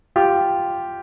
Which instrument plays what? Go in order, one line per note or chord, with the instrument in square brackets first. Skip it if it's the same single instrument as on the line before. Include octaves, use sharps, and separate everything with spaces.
[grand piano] F4 G4